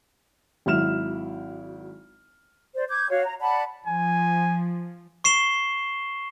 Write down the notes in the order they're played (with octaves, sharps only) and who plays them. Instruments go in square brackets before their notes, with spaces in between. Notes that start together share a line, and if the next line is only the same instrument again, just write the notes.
[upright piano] G#1 F#3 E4 F6 E7
[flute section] C5 D5
D6 G6 G#6
F#4 C#5 F5
A#5
D5 F#5 A5 B5
[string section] F3 [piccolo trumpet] G#5
[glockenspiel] C#6 C7 E7 G7